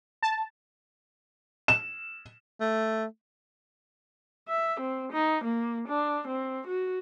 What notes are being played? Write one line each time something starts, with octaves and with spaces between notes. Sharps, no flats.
A5
E7
A3
E5
C4
D#4
A#3
D4
C4
F#4